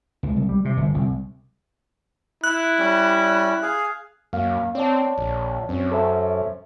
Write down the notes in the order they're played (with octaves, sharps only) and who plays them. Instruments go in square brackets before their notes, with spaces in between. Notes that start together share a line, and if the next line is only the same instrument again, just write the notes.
[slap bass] C#2
C2
G3
C3
G1
C2
[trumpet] E4 [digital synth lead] F#6
[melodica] G3 C#4
G#4 F5
[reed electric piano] C#2 A#3 F5 [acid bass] F#2
[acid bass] C4 [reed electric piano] C#5 D5 A5
[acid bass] A#1
[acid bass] F#2 [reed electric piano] C4 C#4
[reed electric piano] A4 C5 E5